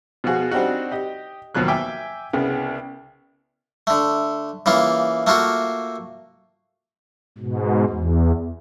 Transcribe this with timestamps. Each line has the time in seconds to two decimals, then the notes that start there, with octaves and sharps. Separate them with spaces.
0.24 B2 F3 F4 F#4 G#4
0.51 G3 C4 D4 D#4 F#4
0.91 G4 D#5
1.55 D#2 B2 F3 F#3 F#6
1.68 E5 G5 G#5 D6
2.33 C2 C#3 B3
3.87 D3 A3
4.66 C#3 E3 A#3 F4
5.27 A3 A#3 F4 F#4
7.38 G#2 B2
7.89 E2